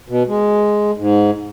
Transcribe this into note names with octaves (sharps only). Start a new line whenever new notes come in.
B2
G#3
G#2